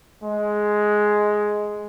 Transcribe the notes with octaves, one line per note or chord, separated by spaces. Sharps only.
G#3